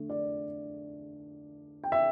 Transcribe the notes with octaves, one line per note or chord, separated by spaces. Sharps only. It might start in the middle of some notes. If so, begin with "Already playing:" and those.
Already playing: D3 A3
D5
G5
E5